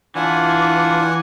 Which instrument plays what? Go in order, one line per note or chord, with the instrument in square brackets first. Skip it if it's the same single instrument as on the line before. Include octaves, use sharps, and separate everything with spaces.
[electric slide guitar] E3 [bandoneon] D4 F4 [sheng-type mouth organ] F#5 G#5